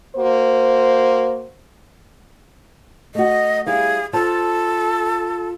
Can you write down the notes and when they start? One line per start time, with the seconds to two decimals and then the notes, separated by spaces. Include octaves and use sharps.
0.16 A#3 F#4 C5
3.15 A3 F#4 D#5
3.66 G3 E4 G#4 F5
4.13 F4 A4 C5 A5